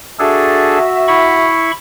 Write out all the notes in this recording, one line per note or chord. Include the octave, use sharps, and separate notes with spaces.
D4 F#4 G#4 A4 E5
E4 B5 C#6